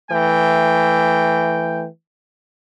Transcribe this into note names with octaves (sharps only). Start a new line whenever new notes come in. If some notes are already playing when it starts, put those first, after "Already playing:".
E3 A3 G5